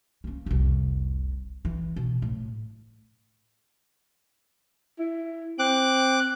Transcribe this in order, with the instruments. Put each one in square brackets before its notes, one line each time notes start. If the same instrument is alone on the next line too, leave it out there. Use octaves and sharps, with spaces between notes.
[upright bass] A#3 C#4
F1 C2
E3
B2
A2
[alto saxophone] E4
[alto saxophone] C4 [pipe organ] D6 F#6